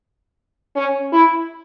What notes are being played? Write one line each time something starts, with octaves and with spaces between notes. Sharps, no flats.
C#4
E4